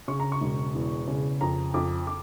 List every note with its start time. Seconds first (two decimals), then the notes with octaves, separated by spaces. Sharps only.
0.08 C#3 C#6
0.20 A#5
0.32 C#6
0.41 E1
0.75 E2
1.08 C#3
1.41 F2 A#5
1.74 F2 D6
2.07 D6